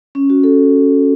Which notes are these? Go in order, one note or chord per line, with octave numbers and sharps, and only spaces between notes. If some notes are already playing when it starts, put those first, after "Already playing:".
C#4
F#4
A4